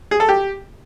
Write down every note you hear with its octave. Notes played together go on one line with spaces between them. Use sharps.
G#4
A4
G4